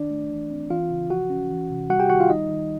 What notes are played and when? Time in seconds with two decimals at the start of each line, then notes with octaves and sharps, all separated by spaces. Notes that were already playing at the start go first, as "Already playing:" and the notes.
Already playing: D#3 D4 D5
0.10 A3
0.31 E3
0.50 C4
0.70 E3 F4 F5
0.91 C#3
1.10 F3 F#4 F#5
1.30 C#4
1.50 E3
1.70 C3
1.90 G3 F#4 F#5
2.00 G4 G5
2.10 D#3 F#4 F#5
2.20 F4 F5
2.30 G3 D#4 D#5
2.50 D#3